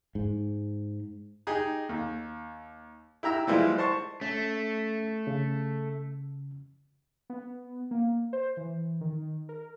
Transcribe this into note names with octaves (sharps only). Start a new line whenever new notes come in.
G#2
D#4 G4 G#4
D#2
E4 G4 A#5 E6
E3 F3 G3 G#3 E4
C5 A5 C#6
A3 C#4
C#3
B3
A#3
C5
E3
D#3
A#4